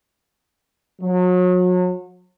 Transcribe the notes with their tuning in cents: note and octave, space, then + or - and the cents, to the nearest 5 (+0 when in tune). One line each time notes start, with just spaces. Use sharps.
F#3 -35